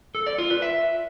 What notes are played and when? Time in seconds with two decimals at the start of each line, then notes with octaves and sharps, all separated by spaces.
0.15 A4
0.27 D5
0.38 F4
0.50 B4
0.62 E5